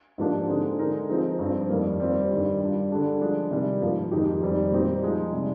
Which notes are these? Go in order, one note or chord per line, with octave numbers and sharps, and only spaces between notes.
G#2 F3 A#3 D4 G4
D3 G#3 C4 D#4
D3 G#3 D#4 A#4
F3 C4 D#4 G#4
G2 F3 C4
F2 D#3 G3 A#3
G3 C4 F4
G2 D#3 G3
G3 D4 F4
D3 G3 D4 G#4
F3 G#3 D4
C3 D#3 G3
G#2 F3 A#3
F2 D#3 G#3 D#4 G4
F2 D#3 G3 C4 G4
A#2 G3 C4 D#4 G4
F3 G#3 D#4
C3 G3